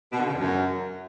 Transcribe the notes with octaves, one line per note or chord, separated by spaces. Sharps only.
B2
D3
C#3
E2
F#2